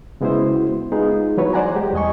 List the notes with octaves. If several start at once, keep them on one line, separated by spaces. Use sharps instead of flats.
C#3 G#3 B3 E4 F#4 C5
G#3 B3 D#4 F4 G#4
E3 F#3 B4 C#5
C5 D5 F#5 G#5 A#5
G#3 G4
E2 G3 D#5 G#5 C#6